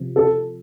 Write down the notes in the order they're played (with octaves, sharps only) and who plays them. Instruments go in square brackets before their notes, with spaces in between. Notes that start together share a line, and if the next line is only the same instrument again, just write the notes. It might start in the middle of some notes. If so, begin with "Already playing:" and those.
Already playing: [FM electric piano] C3 F3
[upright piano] A4